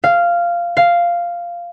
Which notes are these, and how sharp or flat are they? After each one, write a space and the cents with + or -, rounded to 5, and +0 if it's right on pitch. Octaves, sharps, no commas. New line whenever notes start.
F5 -10
F5 -5